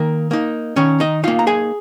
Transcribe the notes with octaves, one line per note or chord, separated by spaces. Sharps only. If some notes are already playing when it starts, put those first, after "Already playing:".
Already playing: D#3 A#3 A#4
A#3 D#4
D#3 C#4 C#5
D#4 D#5
A#3 D#4 F4 F5
A#5
G#4 G#5